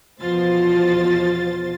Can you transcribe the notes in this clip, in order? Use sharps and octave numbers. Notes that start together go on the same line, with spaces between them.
E2 B2 F3 F4 C5 A6